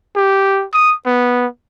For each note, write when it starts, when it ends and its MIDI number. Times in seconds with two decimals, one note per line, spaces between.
0.16 0.65 67
0.74 0.94 87
1.06 1.47 59